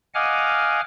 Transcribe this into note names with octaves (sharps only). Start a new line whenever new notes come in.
D#5 F5 F#5 G#5 D6 F6